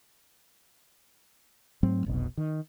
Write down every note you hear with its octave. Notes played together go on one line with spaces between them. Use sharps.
G#2 F#3 A3 C4
F1 B1 B2
D#3